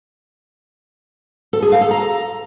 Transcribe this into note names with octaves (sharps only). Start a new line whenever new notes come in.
A4
G#4
F5
A4
A#5